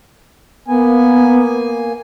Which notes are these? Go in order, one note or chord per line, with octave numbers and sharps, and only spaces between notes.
A#3 B3 G#5